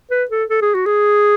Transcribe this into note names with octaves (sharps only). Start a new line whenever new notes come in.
B4
A4
A4
G#4
F#4
G#4